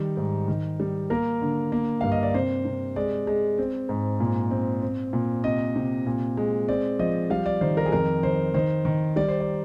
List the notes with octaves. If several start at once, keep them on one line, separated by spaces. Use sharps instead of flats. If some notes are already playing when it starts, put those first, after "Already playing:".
Already playing: D#3 G3
G#2
D#3
G3
A#3 A#4
D3
A#3
G2 F5
D#5
D5
C3 C5
C3
G#3 D5
G#3
C4
G#2
A#2
C4
C4
A#2
C3 D#5
C3
A#2
G#3
C4 D5
F3 D#5
G3 F5
D5
D#3 C5
A#4
G#4
F2 A#4
D#3 C5
D#3 C5
D#3
G3 D5
C5
D5